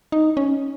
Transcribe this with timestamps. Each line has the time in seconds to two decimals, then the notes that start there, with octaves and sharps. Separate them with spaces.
0.12 D#4
0.37 C#4